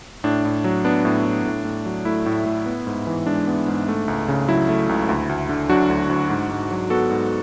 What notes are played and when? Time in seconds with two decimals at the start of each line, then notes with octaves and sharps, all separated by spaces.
0.24 A2 D4
0.45 A2
0.64 F#3
0.85 B3 D4
1.05 A2
1.26 A2
1.45 A2
1.65 A2
1.86 F#3
2.05 A3 E4
2.26 A2
2.46 A2
2.66 B3
2.87 G#2
3.07 E3
3.26 G#3 D4
3.47 B3
3.68 G#2
3.88 A3
4.08 C#2
4.28 C#3
4.48 F#3 E4
4.69 A3
4.89 C#2
5.09 D2
5.29 D2
5.49 D3
5.69 F#3 D4 F#4
5.90 D2
6.09 D2
6.30 G#2
6.50 G#2
6.71 F#3
6.90 B3 F#4 A4
7.11 G#2